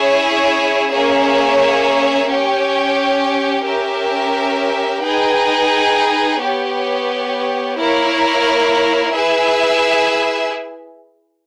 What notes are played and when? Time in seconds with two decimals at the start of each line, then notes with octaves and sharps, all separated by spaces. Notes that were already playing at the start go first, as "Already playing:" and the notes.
Already playing: C#4 E4 G#4 C#5 E5
0.91 A#3 C#4 G#4 C#5 E5
2.28 C#4 G4 C#5 G5
3.66 C#4 G4 A#4 E5
5.03 D#4 G#4 B4 G5
6.40 B3 G4 C#5
7.77 A#3 E4 A#4 C#5
9.14 E4 G#4 B4 E5